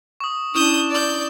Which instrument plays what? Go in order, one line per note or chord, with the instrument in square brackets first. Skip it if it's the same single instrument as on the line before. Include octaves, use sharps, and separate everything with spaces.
[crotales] C#6 D#6
[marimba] C#4 E4 [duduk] D4 [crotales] C#6 E7 [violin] D#6 G6
[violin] D5 G6